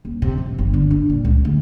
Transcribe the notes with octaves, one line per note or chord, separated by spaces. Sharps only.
D#1
C3
F3
G1
D3
D4
A#2
C#2
D2